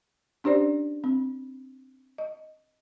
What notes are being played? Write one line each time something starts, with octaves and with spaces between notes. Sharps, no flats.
C#4 D4 G4 C5 D5
C4
D#5